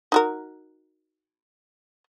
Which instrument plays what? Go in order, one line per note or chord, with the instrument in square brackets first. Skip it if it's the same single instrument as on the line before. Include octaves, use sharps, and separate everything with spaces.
[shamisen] D#4 F#4 A#4